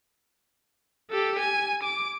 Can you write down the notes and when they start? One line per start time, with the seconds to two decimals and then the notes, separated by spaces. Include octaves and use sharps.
1.10 G4 A4
1.39 G#5
1.83 D6